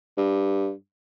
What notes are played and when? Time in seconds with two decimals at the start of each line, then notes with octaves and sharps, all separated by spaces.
0.17 G2